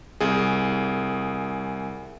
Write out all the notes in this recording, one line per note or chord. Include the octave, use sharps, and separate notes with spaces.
C2 G#4